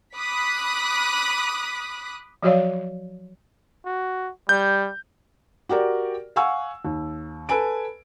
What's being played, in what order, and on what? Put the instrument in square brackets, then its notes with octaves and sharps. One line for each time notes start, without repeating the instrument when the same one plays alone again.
[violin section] B5 D6 D#6 F#6 B6
[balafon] F3 F#3 F#4 C#5 D5 F5
[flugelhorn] F#4
[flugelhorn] G3 [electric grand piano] G6
[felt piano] F#4 G4 A#4 D5
F5 F#5 G#5 C#6 E6
D#2
A4 B4 G#5 D7